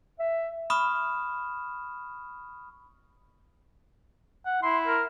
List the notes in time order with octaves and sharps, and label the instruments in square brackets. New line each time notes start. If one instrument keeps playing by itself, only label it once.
[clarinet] E5
[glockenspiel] B5 C#6 D#6 F6 E7
[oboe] F#5
[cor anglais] E4 [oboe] C6
[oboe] A#4